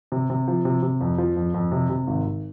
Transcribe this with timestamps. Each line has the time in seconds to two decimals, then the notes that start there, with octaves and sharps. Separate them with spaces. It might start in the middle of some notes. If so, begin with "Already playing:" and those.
0.12 C3
0.30 C3
0.48 F3
0.65 C3
0.83 C3
1.01 F2
1.18 F3
1.36 F2
1.54 F2
1.72 C3
1.90 C3
2.07 G#1
2.25 G#1